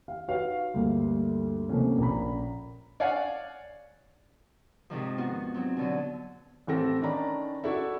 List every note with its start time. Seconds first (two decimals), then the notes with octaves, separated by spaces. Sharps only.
0.08 F5
0.28 D#4 F#4 B4 C#5 F5
0.74 D2 G2 G3 A#3
1.69 C3 F3 A3 A#3 C#4
1.98 A#1 A#2 C#4 A#5 B5
3.00 C#5 D5 F5 F#5 G#5
4.90 G#2 C3 D#3 F3
5.18 B3 F4 F#4
5.54 F#3 C4
5.77 B2 D3 F#3
6.67 A1 E3 C4 A4 A#6
7.02 D#3 C#4 D4 D5 A#5 B5
7.64 E4 F#4 A4 D5 E5